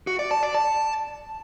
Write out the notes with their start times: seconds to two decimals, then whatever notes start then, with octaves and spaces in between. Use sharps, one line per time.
0.07 F#4
0.19 D5
0.31 A5
0.43 D5
0.55 A5